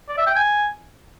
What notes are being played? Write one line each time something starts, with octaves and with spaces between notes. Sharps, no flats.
D5
E5
G5
G#5